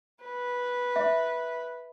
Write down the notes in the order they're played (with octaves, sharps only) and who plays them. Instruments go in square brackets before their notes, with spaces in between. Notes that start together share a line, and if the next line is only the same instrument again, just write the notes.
[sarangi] B4
[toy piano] E5